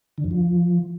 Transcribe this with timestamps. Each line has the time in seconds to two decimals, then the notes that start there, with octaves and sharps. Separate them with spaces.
0.18 D3
0.24 F2
0.31 F3